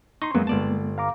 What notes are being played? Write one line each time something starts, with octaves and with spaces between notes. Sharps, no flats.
D#4 C6 C#6
F#2 F#3 G#3 A#3 B3
G1 D5 A5
F5 A#5 D6